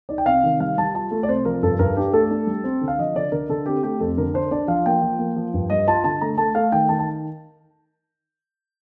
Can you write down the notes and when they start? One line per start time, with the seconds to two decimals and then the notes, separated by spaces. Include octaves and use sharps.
0.09 D#4 D5
0.18 G5
0.26 C3 F5
0.44 D#3
0.60 G3 F5
0.77 G3 A5
0.94 F4 A5
1.11 A3
1.23 D5
1.28 C3 C5
1.45 F3 A#4
1.63 G2 A4
1.79 G2 A#4
1.96 D4 G4
2.13 A3 A4
2.31 D4
2.47 G3
2.64 C4
2.81 D3
2.88 F5
2.98 F3 D#5
3.15 D3 D5
3.32 D3 A#4
3.49 D3 A4
3.66 C4 G4
3.83 A3 G4
4.00 F2 A4
4.17 D3 A#4
4.34 D4 C5
4.51 D4 D5
4.68 F3 F5
4.86 A#3 G5
5.02 F3
5.19 A#3
5.36 F3
5.54 G2
5.70 G3 D#5
5.87 F4 A5
6.04 D3 A5
6.21 A3 A#5
6.38 A3 A5
6.55 A3 F5
6.72 D#3 G5
6.89 D#3 A5
6.99 A5